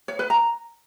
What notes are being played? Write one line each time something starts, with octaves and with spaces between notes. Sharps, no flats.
C#5
B4
A#5